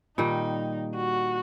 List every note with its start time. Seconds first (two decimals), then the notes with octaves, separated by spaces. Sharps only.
0.18 A#2 D#3 G3 D#4
0.96 F#4